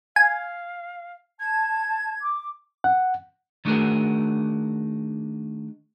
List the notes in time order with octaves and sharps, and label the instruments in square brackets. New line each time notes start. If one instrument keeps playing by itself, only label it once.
[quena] F5 [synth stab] G#5
[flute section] A5 [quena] G#6
[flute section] D6
[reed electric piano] F#5
[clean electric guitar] D#3 A3 D4 F#4 G#4 A#4